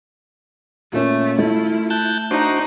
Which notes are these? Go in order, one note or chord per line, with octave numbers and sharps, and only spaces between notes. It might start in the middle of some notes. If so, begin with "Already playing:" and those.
A#2 A3 A#3 C#4
A3 E4 F4
A5 F#6 G6
D4 D#4 F#4 C5